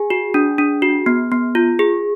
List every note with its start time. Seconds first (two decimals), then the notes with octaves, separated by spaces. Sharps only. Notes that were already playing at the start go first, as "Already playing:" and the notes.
Already playing: G#4 G#5
0.10 F#4
0.34 D4
0.58 D4
0.82 F#4
1.06 B3
1.32 B3
1.55 F4
1.79 G#4